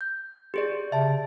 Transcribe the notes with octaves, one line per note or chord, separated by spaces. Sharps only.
G6
G4 G#4 D5
C#3 E5 A5